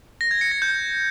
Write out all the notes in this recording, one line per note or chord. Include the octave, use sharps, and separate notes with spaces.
A#6
G#6
C#7
A#6
G6